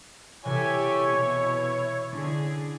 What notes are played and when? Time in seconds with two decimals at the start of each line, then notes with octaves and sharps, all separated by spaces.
0.45 C3 E3 E4 G4 A4 C#5 G#5
1.08 B2
2.12 D3 C#4 D4 E4 G#4